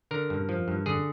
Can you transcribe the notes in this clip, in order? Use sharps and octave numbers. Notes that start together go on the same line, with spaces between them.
D3 A#4
G2
F3
G2
D3 G#4